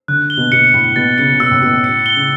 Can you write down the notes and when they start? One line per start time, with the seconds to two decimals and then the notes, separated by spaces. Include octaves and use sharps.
0.08 D3 F#6
0.30 G7
0.37 B2
0.52 B2 C#7
0.74 A2 C#7
0.96 B2 A6
1.18 C#3 C#7
1.33 C#3
1.40 B2 E6
1.51 A2
1.62 B2 E6
1.73 A2
1.84 C#7
2.06 G7
2.16 C#3